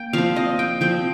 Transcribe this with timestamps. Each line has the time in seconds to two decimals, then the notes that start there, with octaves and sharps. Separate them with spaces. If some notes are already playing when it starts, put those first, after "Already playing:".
Already playing: A#3 G5
0.13 F3 C4 F5
0.36 D#5
0.59 G5
0.81 F3 C4 G5